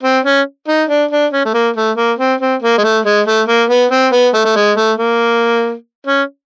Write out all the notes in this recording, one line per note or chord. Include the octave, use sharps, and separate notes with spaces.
C4
C#4
D#4
D4
D4
C#4
A3
A#3
A3
A#3
C4
C4
A#3
G#3
A3
G#3
A3
A#3
B3
C4
B3
A3
A3
G#3
A3
A#3
C#4